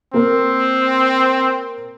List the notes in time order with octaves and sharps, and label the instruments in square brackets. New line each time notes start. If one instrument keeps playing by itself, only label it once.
[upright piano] A#3 A#4 [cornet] C4